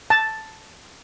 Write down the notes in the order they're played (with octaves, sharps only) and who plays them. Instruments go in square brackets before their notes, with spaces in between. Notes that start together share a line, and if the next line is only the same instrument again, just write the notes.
[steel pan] A5